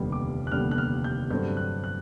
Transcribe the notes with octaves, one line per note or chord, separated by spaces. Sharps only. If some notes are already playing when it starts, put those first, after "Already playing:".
Already playing: F1 D#2 D3 G3 B3
D6
F#6
F1 D#2 D3 G3 B3 F6
F#6
F6
G6
G2 D3 F#3 A3 C4 G6
F#6
F#6